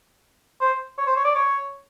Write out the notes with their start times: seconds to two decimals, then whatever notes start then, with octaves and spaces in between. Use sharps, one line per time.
0.61 C5
0.98 C#5
1.07 C5
1.16 C#5
1.25 D5
1.35 C#5